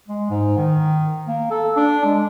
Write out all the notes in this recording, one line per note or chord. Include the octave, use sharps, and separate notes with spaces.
G#3
G#2
D#3
A#3
A4
D4
G#3